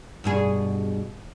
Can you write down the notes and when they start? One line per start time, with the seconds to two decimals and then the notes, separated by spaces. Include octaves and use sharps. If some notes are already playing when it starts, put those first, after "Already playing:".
0.24 G2 B2 G#4